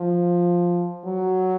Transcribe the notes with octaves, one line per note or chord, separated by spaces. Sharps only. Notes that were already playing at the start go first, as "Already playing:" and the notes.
Already playing: F3
F#3